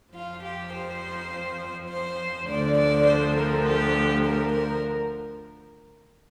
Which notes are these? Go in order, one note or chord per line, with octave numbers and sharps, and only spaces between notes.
F2 F3 F4
G4
C5
C5
D2 D3 F3 D5
D5
C5
A#4
G4
A#4
A#4